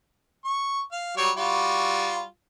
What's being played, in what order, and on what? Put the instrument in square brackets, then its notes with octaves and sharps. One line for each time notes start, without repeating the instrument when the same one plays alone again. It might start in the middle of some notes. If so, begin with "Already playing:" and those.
[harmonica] C#6
F5
F#3 G3 C#5
G3 F4 F#4